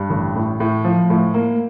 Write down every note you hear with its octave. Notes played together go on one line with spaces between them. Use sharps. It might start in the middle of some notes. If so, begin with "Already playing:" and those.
Already playing: G2
A1
A2
A2
F3
A2
A#3